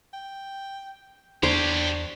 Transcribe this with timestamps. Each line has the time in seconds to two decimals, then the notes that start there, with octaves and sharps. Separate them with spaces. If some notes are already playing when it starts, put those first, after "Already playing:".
0.13 G5
1.43 E2 D4 G4 C5 C#5